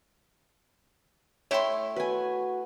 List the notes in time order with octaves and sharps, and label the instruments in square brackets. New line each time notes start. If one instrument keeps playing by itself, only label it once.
[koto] A3 E4 G5 [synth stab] C#5 C6
[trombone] F#4 [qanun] B4 G#5